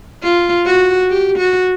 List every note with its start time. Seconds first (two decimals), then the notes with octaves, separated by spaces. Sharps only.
0.23 F4
0.66 F#4
1.09 G4
1.38 F#4